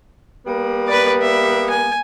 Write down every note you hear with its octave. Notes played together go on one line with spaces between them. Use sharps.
G3 A#3 B3
B4 D5
E5
G#5